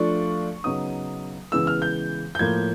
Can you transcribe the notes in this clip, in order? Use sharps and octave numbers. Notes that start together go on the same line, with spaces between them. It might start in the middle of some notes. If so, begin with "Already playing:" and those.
Already playing: F3 A3 D4 F4 C#6
C#3 F#3 B3 D#4 D#6
C#3 E3 G#3 B3 E6
F6
G6
G6
A2 F3 A#3 G#6